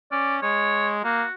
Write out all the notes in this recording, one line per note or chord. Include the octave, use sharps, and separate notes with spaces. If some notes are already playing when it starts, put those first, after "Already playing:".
C#4 D5
G#3 C#5
A#3 F#4